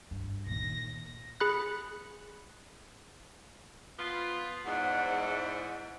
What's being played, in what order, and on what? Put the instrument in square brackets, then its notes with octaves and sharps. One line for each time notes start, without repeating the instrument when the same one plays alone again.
[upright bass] G2
[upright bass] A#2 D#3 [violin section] A#6
[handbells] G#4 B5 F#6
[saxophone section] F3 B3 F4
[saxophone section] E2 G#2 [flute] F#5